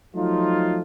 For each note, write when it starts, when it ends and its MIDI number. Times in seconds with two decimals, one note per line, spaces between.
0.15 0.81 53
0.15 0.81 54
0.15 0.81 57
0.15 0.81 63
0.15 0.81 65